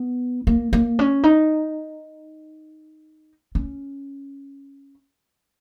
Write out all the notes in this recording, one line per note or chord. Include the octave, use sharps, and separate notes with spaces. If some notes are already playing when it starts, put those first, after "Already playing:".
Already playing: B3
A#3
A#3
C#4
D#4
C#4